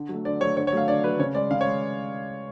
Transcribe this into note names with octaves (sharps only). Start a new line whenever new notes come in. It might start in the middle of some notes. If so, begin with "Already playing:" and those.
Already playing: D3
F#3 A3
D3 D5
F#3 A3 C#5
D3 C#5
C#5
F#3 A3 F5
D3 D5
F#3 A3 B4
C#3 C#5
G#3 D5
C#3 F5
C#5
G#3